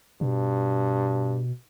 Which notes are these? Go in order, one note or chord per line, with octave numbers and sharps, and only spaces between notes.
G2 B2